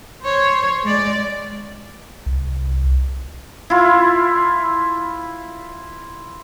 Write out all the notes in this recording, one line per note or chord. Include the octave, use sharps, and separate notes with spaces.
C5 C#5
G#3 D5
C2
E4 F4